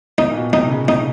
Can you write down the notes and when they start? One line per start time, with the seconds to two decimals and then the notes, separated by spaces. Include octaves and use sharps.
0.18 D#4
0.30 A#2
0.36 B2
0.53 C3 D#4
0.71 C#3
0.88 C3 D#4